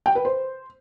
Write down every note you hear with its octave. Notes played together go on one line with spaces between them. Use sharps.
G5
B4
C5